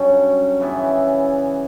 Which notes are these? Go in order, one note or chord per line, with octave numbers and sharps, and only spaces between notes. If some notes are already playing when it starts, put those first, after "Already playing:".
Already playing: G2 F#3 C#4
C#3 E3 B3 E4